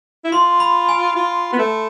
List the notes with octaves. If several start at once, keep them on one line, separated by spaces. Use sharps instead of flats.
E4
F4 C6
B5
G#5
F4
B3
A3